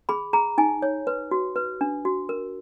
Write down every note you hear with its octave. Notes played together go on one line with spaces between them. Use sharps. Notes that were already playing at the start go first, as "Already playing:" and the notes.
G#4 B5
G#4 A#5
D#4 G#5
C#5
B4
F#4
B4
D4
F#4
A#4